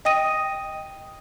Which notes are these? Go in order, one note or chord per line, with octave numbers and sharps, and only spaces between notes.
D#5 G5 D#6 A#6 D#7